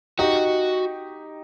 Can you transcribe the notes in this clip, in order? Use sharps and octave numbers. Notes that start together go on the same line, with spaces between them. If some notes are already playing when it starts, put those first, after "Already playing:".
D#4 F#4 G4